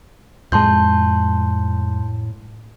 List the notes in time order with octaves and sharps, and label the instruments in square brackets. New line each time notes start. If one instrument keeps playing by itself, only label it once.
[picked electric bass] F2 G#3 [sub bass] A2 [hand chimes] A5 C6 G6